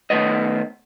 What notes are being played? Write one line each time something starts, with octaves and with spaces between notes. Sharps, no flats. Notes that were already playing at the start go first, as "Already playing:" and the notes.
D#3 A3 B3 D#5